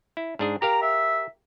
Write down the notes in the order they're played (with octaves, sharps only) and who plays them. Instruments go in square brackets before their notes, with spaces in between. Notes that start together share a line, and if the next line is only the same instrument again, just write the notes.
[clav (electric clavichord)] E4
G#2 D4 G#4
[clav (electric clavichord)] G4 A#4 F5 [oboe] A#5
[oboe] E5